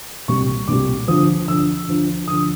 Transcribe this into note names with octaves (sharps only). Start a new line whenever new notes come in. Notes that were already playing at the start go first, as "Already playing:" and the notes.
C2 A#2 G3 C#6
C2 A#2 G3 D6
D2 D3 F3 D#6
D2 D3 F3 E6
D2 D3 F3
D2 D3 F3 D#6